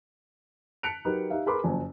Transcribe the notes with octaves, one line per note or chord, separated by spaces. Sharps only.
A5 F#6 B6 C#7 D7 F7
F#3 D#4 G4 A#4 B4 D#5
D#4 G4 E5 F5
G#4 A#4 B4 B5 C6 D6
F#1 F2 G#5